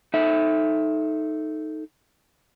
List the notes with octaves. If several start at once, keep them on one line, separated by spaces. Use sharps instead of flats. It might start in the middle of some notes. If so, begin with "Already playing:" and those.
D#4 A4 E5